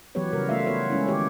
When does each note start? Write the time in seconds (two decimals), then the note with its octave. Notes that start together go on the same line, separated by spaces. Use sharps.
0.15 E3 F#3 B3 G4 B4 C#5
0.33 C#3 G3 A#4
0.49 A3 F4 E5 F5
0.67 B3 F4 B4 C#5
0.90 G#3 C#4 E4
1.07 D#3 G4 C#5